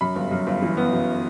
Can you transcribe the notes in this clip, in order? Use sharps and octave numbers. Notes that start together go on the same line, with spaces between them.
F#2 B5
G1
F#2
G1
E3
B3
F#2